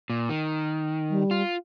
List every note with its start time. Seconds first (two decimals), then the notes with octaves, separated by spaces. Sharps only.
0.10 A#2
0.29 D#3
1.10 G3
1.31 F4